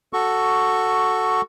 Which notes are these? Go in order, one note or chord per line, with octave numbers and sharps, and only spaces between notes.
F#4 A4 C#6